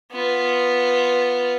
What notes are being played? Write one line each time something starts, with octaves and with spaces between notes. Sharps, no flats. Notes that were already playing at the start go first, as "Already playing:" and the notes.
B3 F4